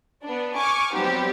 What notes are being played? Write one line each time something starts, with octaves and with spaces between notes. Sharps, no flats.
B3 D4
G#5 C#6 D6 F6
F#3 G3 B3 C4 D#4 G4